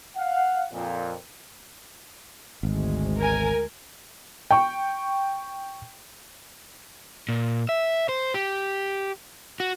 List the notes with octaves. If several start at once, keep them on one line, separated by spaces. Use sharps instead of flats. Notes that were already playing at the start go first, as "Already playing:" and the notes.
F5 F#5
F2 A#2
G#1 D2 G#3
A#4 G#5
G5 C#6
A#2
E5
C5
G4
F#4